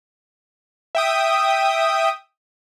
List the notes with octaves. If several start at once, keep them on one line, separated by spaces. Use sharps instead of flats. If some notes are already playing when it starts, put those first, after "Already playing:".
E5 G5 D#6